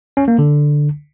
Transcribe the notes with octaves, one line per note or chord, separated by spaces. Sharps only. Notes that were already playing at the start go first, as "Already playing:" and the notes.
C#4
A#3
D3